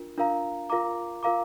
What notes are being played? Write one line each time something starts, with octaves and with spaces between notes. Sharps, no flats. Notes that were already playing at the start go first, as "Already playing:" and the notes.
Already playing: D4 F4 A#4
D4 F4 A#4 F5 A#5
F4 A#4 F5 A#5 D6
F4 A#4 F5 A#5 D6